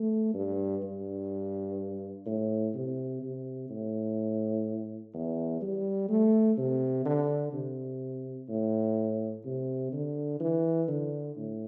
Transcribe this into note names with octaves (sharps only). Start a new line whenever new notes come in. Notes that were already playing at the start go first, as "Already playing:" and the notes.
Already playing: A3
G2
G2
A2
C3
C3
A2
E2
G3
A3
C3
D3
C3
A2
C3
D3
E3
D3
A2